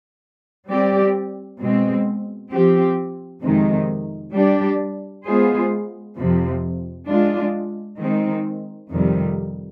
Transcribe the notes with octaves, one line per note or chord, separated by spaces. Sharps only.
G3 C4 G4 D5
B2 G#3 C4
F3 C4 G4
F2 C3 D#3 G#3
G3 D4 G4 D5
G#3 B3 F4 G#4 C5
F2 C3 F3
G#3 D4 F4
D#3 G#3 C4 D#4
F2 C3 D#3 G3